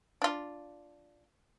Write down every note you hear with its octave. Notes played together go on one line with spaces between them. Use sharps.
D4 F4